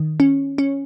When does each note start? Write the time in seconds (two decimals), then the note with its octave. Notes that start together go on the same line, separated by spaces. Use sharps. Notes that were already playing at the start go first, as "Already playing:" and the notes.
Already playing: D#3
0.20 C#4
0.58 C#4